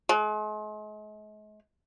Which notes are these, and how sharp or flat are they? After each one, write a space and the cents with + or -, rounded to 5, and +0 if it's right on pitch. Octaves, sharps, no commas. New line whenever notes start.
G#3 +40